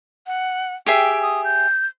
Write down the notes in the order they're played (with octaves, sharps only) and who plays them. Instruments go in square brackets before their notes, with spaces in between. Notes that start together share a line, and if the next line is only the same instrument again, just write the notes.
[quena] F#5
[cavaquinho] G4 G#4 E5 [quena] G5
[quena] D#6
G6